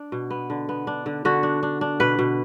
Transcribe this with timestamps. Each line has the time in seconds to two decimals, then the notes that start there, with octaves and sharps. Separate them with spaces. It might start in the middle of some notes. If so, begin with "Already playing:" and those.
Already playing: D4
0.12 B2
0.31 B3
0.50 D3
0.69 B3
0.87 D4
1.06 D3
1.25 D3 F#4
1.43 D4
1.63 D4
1.81 D4
2.00 B2 B4
2.19 B2